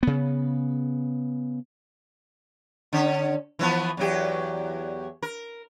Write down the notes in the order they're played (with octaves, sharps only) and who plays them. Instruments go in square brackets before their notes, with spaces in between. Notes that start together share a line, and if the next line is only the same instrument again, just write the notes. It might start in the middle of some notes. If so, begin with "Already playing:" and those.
[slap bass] C#3 B3
[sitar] D3 C#4
E3 F3 B3
E2 F#3 G4
A#4